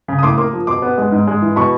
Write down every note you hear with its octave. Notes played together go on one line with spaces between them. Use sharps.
C#3
D#6
A2 C6 D6
A#3 C6 D6
F3
B2 C6 D6
B3
G#3
G#2
G#3
E3
B2 B5 C#6